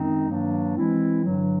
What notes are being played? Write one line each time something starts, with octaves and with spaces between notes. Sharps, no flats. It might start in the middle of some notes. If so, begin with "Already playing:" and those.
Already playing: F#2 D#3 G#3 C4 D#4
G2 D#3 F#3 A#3 D4
E3 G#3 C4 E4
G2 D3 F#3